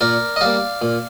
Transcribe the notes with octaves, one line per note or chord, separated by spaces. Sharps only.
A#2 A#4 D5
D#5
G3 A#3 D5 F5
A#2